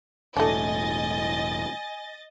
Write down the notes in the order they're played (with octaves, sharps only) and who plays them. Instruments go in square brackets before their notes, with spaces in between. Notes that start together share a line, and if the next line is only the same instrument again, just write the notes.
[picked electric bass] E1 A2 [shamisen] A3 D4 [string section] D#5 A6 [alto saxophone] G#5